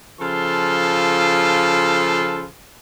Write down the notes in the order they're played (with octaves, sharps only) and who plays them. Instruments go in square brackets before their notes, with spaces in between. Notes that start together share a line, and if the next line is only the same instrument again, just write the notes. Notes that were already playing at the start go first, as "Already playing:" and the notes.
[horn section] C#3 F3 F4 A4 C6